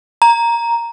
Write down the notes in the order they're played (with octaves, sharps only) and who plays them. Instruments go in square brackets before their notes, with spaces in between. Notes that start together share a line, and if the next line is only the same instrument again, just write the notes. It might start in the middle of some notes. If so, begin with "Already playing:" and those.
[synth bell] A#5